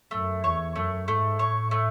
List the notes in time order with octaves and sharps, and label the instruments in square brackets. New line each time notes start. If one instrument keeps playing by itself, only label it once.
[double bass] F#2 [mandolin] A3
[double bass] E2 [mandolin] C#5
[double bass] F#2 [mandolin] A3
[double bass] G#2 [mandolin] A3
[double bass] A2 [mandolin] C#5
[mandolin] A3